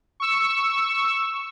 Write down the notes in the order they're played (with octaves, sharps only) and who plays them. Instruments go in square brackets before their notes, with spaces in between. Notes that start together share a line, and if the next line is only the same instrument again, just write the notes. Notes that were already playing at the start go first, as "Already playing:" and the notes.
[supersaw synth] C#6 E6